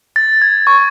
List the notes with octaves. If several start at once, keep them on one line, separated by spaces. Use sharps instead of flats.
A6
G#6
C#6